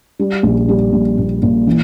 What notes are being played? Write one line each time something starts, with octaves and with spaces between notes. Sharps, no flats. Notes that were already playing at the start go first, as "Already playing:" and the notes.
G3
A#1
G3
A#1
A#2
A#2
E3